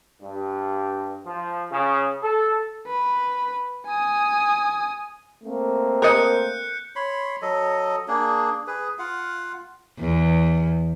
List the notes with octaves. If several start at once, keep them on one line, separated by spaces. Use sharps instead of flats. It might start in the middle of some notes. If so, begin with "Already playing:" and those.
G2
F3
C#3
A4
B4
G#5 D#6
A3 A#3 C4
A#4 D#5 F#6 G6 C#7
C#5 B5 C6
F#3 A4 D#5
A#3 D4 G#4
G#4 B4
F4 F5 F#5
E2